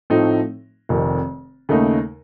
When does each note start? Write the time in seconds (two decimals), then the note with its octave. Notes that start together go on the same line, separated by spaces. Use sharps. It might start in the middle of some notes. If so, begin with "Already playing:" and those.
0.10 A2 F3 A3 C4 D#4
0.89 F1 F2 C3 D#3
1.69 D#2 C#3 A3 D#4